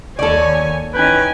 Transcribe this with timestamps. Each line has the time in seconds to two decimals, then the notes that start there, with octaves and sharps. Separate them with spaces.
0.19 D#2 A4 C#5 D5 G#5
0.94 E3 C#4 D#4 B4 G5 G#5